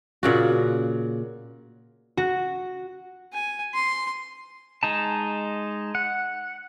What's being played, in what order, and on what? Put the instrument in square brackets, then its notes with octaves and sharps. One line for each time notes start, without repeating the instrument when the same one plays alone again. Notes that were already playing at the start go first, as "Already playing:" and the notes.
[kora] A#2 C#3 F#4
[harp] F#4
[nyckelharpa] G#5
C6
[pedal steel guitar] G#3 D#4 A5
F#5